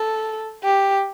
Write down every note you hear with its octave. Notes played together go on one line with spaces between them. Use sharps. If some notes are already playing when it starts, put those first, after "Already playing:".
Already playing: A4
G4